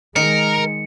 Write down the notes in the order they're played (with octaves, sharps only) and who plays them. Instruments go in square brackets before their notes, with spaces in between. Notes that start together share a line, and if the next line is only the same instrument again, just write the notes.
[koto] D#3 [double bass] G#3 [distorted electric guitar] A#4 [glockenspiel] C#7